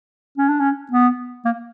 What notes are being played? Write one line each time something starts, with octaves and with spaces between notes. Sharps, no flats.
C#4
D4
C#4
B3
A#3